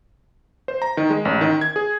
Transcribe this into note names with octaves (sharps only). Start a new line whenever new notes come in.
C5
A#5
D#3
G#3
A1
D#3
G#6
G#4